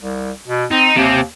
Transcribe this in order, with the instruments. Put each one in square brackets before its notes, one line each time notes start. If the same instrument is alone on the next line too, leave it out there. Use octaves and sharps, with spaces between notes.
[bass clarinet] C2
B2
[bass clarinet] C4 [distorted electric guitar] D#4
[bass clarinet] D#2 [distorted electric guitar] C3 C4